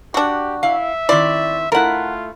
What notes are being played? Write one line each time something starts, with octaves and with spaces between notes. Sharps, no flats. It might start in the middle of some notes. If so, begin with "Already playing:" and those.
D4 F#4 G4
E4 E5 F5
D#3 C4 E4 D5
A3 E4 F4 A#4 F#5